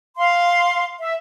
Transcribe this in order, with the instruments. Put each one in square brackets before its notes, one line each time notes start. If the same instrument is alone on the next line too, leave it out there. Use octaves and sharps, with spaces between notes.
[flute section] F5 C6
E5